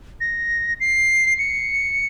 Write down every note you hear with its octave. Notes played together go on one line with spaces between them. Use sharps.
A#6
C7
C#7